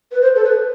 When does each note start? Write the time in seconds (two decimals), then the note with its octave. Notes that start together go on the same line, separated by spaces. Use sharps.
0.12 B4
0.22 C5
0.35 A4
0.45 B4